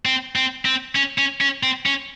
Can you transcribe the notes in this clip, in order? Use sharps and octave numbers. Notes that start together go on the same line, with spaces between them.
C4
C4
C4
C#4
C#4
C#4
C4
C#4